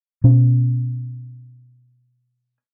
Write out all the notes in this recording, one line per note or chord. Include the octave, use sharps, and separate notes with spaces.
B2 C#4